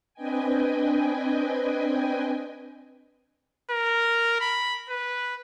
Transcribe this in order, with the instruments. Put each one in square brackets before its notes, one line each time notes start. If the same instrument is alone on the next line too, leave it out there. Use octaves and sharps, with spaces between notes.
[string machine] C4 D4 B4 D#5 G5 G#5
[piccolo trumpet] A#4
B5
B4